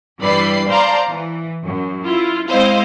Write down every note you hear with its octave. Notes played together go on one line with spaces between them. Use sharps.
G2 E3 G3 D5 B5 C7
C5 D5 F5 A5 A#5 C6
E3
F#2
E4 F4
G#3 C4 E4 C5 D#5 F5